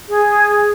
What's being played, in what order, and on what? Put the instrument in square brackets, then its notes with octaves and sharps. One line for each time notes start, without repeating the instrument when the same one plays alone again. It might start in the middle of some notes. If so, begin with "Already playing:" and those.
[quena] G#4